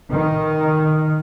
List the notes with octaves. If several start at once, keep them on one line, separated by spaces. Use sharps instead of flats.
D#3